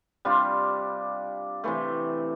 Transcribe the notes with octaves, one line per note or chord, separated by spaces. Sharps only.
C3 G3 D4 F4
C3 E3 A3